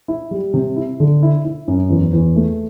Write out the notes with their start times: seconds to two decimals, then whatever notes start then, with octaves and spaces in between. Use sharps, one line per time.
0.08 E4
0.31 G3
0.54 C3
0.76 E4
1.00 D3
1.23 E4
1.45 E4
1.68 F#2
1.90 E2
2.13 E2
2.36 A3